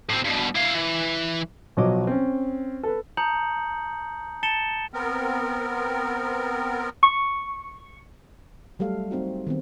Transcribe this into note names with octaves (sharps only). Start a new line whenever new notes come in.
A2 C4
G2 B2
E4 F5
E3
B1 F3 F#3 C#5 D#5 D6
C4 C#4
A4 B4
A5 A#5 D#6 G6 C#7 F#7
A5 A6 C#7 E7 G7
B3 C4 A#4
C#6
F#3 G3 A3 A4 F5
C4 D#4 F#4
D#3 B3 C4